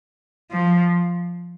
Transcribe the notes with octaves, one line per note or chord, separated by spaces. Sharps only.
F3